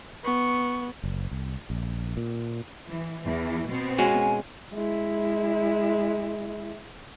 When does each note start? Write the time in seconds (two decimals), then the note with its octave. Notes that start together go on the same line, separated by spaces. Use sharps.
0.24 B3 C#6
1.04 F#1
1.31 C2
1.70 A#1
2.17 A#2
2.88 E3
3.23 E2 E3
3.68 B2 B3 C4
3.98 G#3 C#4 F#4 G#5
4.73 G#3 E4